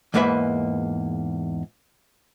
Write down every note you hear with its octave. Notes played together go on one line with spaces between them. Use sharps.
E2 G#2 A#3 B4 E5 B5